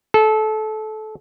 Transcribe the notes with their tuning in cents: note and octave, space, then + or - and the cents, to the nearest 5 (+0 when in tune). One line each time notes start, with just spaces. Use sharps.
A4 -25